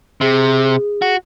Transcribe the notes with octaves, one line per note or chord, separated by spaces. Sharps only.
C3 G#4
F#4